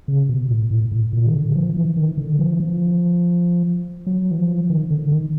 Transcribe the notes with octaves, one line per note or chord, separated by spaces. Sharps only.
C#3
B2
A2
A2
A2
A#2
D#3
D3
F3
E3
D#3
D3
F3
E3
F3
F#3
E3
F3
D#3
D3
D#3